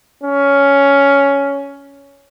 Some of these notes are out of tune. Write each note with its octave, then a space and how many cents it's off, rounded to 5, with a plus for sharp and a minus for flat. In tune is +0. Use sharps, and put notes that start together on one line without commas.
C#4 +10